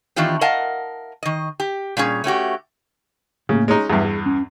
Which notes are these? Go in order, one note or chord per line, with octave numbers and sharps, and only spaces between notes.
D#3 E3 B3 D4 F4 G4
A#4 D#5 F5 F#5 A5
D#3 D#5
G4
A#2 G3 C#4 G#4
A3 C#4 F#4 G4
A2 C#3 A#3
G#3 C#4 D#4
E2 G2 G#4 B4 E5
G#4
C#4